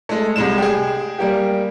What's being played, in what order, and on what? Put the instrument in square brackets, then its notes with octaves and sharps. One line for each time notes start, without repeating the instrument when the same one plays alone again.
[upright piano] G#3 A3
C2 G#3 E7
G4 G#4
G3 A#3 G4